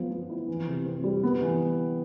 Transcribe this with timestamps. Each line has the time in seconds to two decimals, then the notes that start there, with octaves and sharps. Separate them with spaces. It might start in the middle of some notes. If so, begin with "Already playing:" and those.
Already playing: F3 B3
0.10 F3
0.29 E4
0.48 E3
0.67 C3
0.86 C4
1.04 G3
1.23 B3
1.42 E3